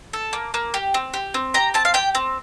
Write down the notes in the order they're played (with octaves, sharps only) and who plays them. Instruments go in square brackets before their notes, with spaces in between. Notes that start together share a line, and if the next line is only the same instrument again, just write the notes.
[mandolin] A4
A#3
A#3
G4
C4
G4
C4
G4 A#5
C4 A5
F5
G4 G5
C4